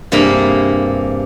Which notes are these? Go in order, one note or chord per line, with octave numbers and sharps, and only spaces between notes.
G2 C3 A#3 G#4 A#4 B5